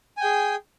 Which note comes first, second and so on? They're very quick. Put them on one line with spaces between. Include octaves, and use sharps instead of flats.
G#5 G5 G#4